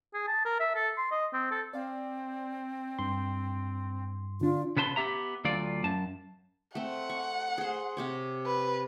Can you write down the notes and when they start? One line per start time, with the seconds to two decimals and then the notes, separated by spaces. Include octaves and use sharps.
0.14 G#4
0.27 A5
0.45 A#4
0.60 E5
0.75 A4
0.97 C6
1.11 D#5
1.33 C4
1.51 A4
1.73 C4 D5 F5
2.99 G2 C6
4.41 D3 D4 F4
4.76 C#3 B3 B4 A5 C6
4.96 B3 G4 E5 A#5
5.45 D2 F#3 F4 D5
5.84 F#2 A5
6.75 A3 C4 F#5
7.10 C#6
7.58 G#4 C5
7.97 C3 G4 C#5
8.46 B4